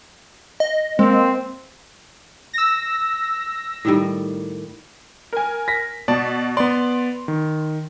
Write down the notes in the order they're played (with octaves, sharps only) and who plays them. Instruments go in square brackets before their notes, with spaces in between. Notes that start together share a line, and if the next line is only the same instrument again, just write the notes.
[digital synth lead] D#5
[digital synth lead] G#3 [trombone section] A#3 C4
[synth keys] E6 A#6
[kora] A2 D#3 G3
[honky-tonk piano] A#4 G#5
[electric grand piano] A#6 B6
[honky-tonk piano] B2 [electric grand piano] D5 A5
[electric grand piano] B3 D5 [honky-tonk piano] C6
[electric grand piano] D#3